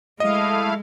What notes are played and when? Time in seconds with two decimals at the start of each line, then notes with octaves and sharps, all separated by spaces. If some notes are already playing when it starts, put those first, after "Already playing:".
0.20 G#3 A3 E4 D#5 F5 D#6